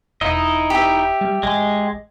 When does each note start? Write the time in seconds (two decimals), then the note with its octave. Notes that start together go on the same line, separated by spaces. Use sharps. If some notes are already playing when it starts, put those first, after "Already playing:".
0.21 E1 D#4 E4 D#5
0.70 G4 E5
1.21 G3
1.43 A1 G#3